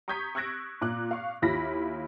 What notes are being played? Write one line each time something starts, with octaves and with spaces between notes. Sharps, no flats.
A#5 C#6 D#6 G6 G#6 B6
C#6 E6 F#6 G#6 A#6 D7
A#2 D6 F#6
F5 C#6
D#2 E4 F4 B5 A#6 B6